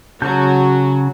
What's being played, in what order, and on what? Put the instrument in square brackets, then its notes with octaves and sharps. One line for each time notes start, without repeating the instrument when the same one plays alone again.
[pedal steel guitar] C#3 A5 G6 [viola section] F#3 F#4